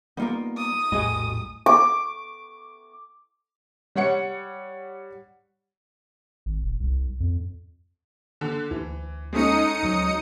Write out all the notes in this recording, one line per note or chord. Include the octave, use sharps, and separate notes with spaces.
G3 A#3 B3 D#4 F4 A#4
D#6
A#1 E2 A2 G3 F#4 G#4 D#5
D6
G3 C#5 F#5 C#7
G#1
D#1
C2
F2
D3
D2 E3
G#3 A3 C#4 D#4 D#6 C#7
D2 F#3